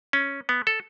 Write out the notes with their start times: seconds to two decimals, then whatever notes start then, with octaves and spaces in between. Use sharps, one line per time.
0.13 C#4
0.49 B3
0.67 A4